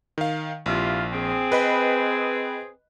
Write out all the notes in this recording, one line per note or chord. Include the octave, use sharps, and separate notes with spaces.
D#3 F5
A#1 C3 E4 F4
C4 G#4
B4 D#5 B5